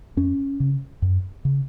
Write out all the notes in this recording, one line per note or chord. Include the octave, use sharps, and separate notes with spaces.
F2 C#4
C#3
F#2
C#3